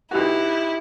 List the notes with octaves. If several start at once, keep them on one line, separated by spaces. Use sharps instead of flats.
B1 E4 F#4 G4